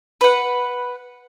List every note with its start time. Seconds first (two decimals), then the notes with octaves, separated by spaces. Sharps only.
0.21 B4 F#5